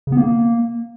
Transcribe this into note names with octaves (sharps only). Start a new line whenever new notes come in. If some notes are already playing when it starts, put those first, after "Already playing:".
C#3
B3
A#3